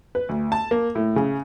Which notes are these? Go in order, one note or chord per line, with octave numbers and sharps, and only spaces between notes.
B4
D2
A5
A#3
A2
C#3